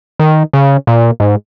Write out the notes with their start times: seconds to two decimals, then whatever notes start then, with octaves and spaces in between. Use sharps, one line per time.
0.20 D#3
0.53 C#3
0.87 A#2
1.20 G#2